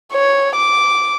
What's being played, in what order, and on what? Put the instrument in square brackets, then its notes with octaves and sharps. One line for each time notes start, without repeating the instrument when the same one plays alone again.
[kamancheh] C#5
D6